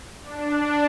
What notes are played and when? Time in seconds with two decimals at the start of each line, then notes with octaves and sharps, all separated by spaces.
0.23 D4